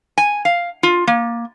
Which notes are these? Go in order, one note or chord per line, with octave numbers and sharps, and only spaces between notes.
G#5
F5
F4
A#3